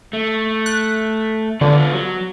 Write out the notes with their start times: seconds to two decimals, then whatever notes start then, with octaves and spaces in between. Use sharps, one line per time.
0.13 A3
0.66 F#6
1.61 D3 B3 F4 B4
1.93 F#3